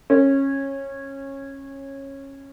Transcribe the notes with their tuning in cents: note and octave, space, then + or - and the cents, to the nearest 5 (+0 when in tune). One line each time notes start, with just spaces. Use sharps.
C#4 -20